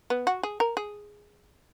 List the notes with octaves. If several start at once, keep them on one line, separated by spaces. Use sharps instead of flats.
B3
F#4
G#4
A#4
G#4